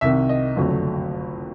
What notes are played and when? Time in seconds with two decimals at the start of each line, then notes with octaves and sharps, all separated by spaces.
0.01 C2 C3 D#3 E5
0.29 D#5
0.56 F#1 F2 D3 F#3 A3